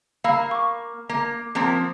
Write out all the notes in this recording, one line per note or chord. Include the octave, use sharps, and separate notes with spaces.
A#3 F5 B5 E6
C#6 D6
A#3 A#5
F3 A#3 C4